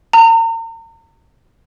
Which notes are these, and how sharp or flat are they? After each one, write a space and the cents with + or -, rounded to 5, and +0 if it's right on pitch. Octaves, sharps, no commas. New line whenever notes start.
A#5 -40